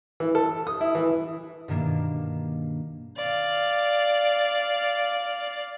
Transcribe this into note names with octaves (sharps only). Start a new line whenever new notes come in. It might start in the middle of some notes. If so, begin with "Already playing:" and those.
E3
A4
D#6
E4
E3
G2 B2 D#3 A#3 D4
D5 F5